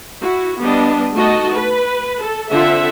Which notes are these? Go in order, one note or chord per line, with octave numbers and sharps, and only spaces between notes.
E4 F#4
G3 B3 D4 D#5
A3 D#4 F#4 D#5 A5
B4
A4
D3 C4 F4 E5 F#5